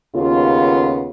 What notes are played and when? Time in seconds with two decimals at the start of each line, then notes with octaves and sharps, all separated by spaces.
0.15 D#2 C#3 B3 F4